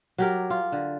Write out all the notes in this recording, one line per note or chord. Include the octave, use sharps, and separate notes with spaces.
F#3 G4 A#4
F4
D3